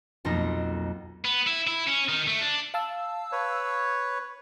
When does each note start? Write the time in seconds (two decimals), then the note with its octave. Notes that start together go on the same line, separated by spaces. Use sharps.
0.25 B1 F2 A#3 D#4 A#5 A#6
1.25 B3
1.47 E4
1.67 E4
1.87 C#4
2.08 D#3
2.27 A3
2.42 D4
2.74 F5 A5 E6
3.32 B4 C#5